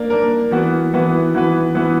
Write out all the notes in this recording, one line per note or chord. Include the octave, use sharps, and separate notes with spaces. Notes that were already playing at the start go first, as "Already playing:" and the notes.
Already playing: A#3 D4 A#4
A#3 D4 A#4
E3 B3 F#4 B4
E3 B3 F#4 B4
E3 B3 F#4 B4
E3 B3 F#4 B4